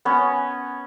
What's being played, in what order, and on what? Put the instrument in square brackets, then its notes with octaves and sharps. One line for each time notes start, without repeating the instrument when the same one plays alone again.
[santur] B3 C#4